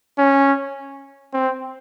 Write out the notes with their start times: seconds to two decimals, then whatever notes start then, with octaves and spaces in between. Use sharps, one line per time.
0.18 C#4
1.34 C4